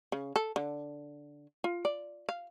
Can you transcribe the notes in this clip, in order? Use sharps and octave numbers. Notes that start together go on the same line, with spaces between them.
C#3
A4
D3
F4
D5
F5